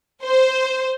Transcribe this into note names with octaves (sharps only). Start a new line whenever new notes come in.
C5